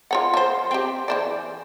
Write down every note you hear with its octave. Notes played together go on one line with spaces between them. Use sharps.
F4 C#5 F#5
F3 C5
C4 G4
E3 C5 D5